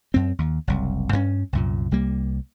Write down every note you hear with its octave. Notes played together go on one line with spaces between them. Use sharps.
F#2 C4
D#2
F#1 C2
G2 B3 C#4
C2 F#2 A#2
C2 G3 A#3